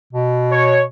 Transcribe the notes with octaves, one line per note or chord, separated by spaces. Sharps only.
B2
C#5